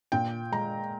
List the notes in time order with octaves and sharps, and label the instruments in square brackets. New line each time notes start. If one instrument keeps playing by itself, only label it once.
[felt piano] A#2 G5
G#3 A#5